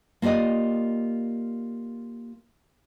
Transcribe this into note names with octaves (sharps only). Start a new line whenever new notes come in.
A#3 F4 G4 D5 D#5